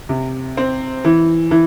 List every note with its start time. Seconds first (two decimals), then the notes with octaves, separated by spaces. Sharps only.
0.09 C3
0.57 C4
1.05 E3
1.51 E3